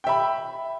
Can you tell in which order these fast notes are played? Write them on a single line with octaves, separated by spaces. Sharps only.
G5 E5 B5